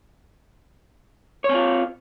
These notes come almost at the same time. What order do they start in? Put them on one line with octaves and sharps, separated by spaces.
C#5 C4 F4